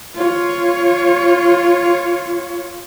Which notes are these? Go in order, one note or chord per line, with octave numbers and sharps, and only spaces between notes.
F4 C#5